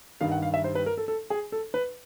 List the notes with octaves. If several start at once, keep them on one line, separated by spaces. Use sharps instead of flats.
G2 D#3 G3 F5
F#5
F5
E5
C5
B4
A#4
A4
A4
G#4
A4
B4